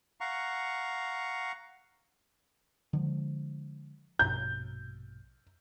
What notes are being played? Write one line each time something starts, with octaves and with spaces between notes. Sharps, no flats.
F5 F#5 A#5 C#6
D3 F3 G#3
A#1 G2 B2 G6